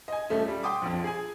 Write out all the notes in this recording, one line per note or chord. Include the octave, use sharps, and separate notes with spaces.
D#5 G#5
D#1 A3 C#4
G3
G5 C6 D6 D#6
A#1 F2
G#4 G#5